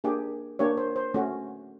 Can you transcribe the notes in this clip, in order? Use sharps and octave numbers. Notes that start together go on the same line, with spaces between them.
A#3 D4 G4 G#4
A#3 D4 G4 C#5
C5
C5
A3 C#4 F#4